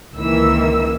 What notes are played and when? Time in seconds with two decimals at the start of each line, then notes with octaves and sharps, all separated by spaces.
0.15 C#2 A#2 D#3 E3 A#3 E6